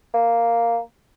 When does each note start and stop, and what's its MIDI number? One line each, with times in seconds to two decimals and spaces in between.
0.14 0.78 58